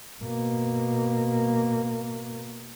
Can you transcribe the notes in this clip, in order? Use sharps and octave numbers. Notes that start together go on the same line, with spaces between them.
B2 A#3